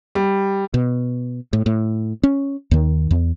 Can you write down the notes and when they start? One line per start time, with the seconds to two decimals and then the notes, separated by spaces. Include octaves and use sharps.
0.15 G3
0.74 B2
1.53 A2
1.66 A2
2.23 C#4
2.71 D#2 D#3
3.11 E2